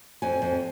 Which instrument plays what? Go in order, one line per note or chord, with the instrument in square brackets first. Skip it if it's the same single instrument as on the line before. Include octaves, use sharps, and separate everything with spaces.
[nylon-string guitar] F2 G#5
F2